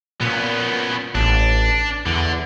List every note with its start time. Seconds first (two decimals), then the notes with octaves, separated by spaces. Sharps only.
0.21 A#2 B3 C#4
1.15 A1 D4
2.06 E2 D3